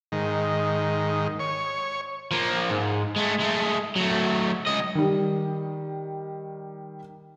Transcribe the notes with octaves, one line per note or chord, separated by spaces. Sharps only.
G#2 D#3
C#5
F3 A#3
G#2
G#3 A3
G#3 A3
F#3 A3
C#2 D#5
D#3 G3